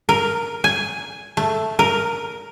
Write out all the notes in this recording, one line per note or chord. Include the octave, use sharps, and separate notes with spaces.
A#4
G#5
A3
A#4